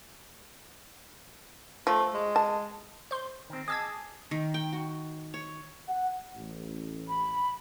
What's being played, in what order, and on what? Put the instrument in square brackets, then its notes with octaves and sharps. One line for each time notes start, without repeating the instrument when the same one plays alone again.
[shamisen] F3 [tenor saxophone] A3
[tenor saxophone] G#3
[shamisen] A5
[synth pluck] C5 C6
[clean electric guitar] D#3 C4
[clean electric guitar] G#4 [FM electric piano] D#5 G#5 A5 [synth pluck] D6 E6 G#6
[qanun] D#3
G5
F#4
C#5
[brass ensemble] F#5
A1
[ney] B5